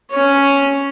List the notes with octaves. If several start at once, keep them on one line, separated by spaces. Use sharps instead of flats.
C#4 C#5